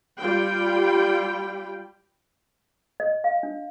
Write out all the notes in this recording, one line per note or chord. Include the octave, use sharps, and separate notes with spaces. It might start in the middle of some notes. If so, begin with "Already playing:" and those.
G3 F4 G5 B5
D#5
F5
D4